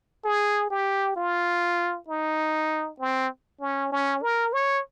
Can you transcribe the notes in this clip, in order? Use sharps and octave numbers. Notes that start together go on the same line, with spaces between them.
G#4
G4
F4
D#4
C4
C#4
C#4
A#4
C#5